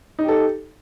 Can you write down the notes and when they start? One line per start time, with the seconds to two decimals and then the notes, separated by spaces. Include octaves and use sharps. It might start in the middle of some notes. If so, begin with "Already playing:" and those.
0.19 D#4
0.23 G4
0.28 A4